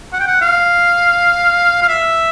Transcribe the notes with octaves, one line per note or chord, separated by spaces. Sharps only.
F#5
G5
F#5
F5
F5
E5